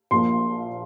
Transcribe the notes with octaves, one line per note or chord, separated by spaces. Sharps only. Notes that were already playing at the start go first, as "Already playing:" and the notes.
A#1 A#2 F3 A#3 C6